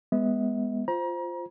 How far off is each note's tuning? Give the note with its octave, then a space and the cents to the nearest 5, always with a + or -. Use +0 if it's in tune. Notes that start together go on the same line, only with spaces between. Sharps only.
G#3 -20 B3 +0 E5 -40
F4 +0 C5 +0 A#5 +35